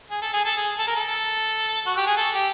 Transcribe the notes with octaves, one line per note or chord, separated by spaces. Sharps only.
G#4
A4
G#4
A4
G#4
A4
A#4
A4
F#4
G4
G#4
A4
G4